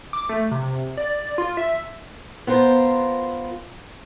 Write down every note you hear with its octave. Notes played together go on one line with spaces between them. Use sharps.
D6
A3
C3
D5
F4
E5
B3 F4 A#4 C5